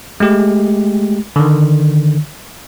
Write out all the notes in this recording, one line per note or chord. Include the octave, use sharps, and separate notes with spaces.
G#3 A3 G4
D3 D#3